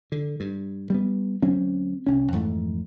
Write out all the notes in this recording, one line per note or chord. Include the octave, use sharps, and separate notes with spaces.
D3
G2
G3 A3 B3
D2 F#3 C4 C#4
C2 C#4
F2 G#2 E3 A3